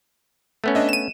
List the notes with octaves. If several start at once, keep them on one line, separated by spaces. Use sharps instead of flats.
A3 B3 C#4
D4 D#5 E5
D#7 E7